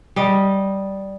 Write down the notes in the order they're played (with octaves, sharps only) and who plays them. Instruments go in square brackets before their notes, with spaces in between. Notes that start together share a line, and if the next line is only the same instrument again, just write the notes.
[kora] G3 D#5